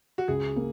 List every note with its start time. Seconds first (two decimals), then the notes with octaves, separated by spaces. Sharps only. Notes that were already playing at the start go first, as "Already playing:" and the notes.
0.18 F#4
0.28 C#2 G#4
0.56 A#3